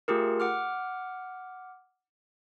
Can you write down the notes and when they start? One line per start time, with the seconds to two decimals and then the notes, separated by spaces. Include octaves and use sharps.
0.08 A3 F4 G4 G#4 A#4
0.40 F#5 D6 F6